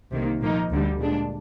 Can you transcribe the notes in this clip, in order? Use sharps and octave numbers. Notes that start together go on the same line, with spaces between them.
C2 C3 D#3 A#3
A#2 F3 A#3 D#4
D2 D3 G3
A#2 G#3 D4